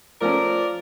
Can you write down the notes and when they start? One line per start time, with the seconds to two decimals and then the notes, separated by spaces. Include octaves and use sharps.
0.21 F3 A3 C#4 A#4 D5